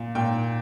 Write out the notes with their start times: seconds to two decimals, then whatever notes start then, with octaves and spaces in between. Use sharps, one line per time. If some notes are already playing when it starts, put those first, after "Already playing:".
Already playing: A#2
0.15 A#2 G5